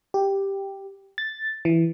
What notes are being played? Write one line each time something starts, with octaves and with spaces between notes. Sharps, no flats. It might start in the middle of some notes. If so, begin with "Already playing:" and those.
G4
A6
E3